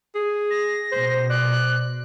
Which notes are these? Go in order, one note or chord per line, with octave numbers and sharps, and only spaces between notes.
G#4
A#6
B2 C5
D5 F#6